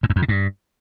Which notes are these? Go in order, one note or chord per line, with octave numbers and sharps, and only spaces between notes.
G#2
F#2
F2
C#3
G2